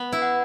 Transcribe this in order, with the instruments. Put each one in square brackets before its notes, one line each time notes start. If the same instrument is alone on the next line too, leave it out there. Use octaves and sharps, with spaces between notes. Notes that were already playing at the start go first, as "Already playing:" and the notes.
Already playing: [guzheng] B3
E4
[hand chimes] F#5